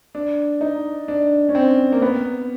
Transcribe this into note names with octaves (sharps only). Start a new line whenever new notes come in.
D4
D#4
D4
C#4
C4
A#3
B3